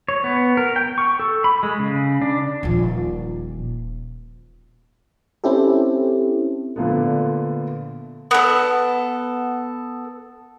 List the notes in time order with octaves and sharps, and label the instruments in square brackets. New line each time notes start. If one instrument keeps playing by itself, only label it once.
[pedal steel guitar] C#5
B3
A#4
G5
C#6
A4
B5
G#3
C#3
D4
[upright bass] D#1 F3
[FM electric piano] C4 C#4 E4 G4 A4
[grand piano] A#2 D3 F3 A3 B3
[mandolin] B3 A4